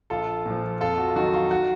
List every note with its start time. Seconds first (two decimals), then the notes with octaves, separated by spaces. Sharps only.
0.10 A#1 F4 A4
0.45 A#2 F3
0.81 F2 F4 A4
0.98 F#4
1.08 F4
1.16 D#3 F#3 F#4
1.34 F4
1.51 F#4